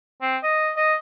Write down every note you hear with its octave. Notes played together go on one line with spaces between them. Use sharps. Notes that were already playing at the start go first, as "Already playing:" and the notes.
C4
D#5
D#5